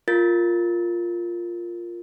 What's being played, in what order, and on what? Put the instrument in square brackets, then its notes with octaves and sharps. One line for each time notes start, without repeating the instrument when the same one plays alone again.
[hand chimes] F4 A#4 A6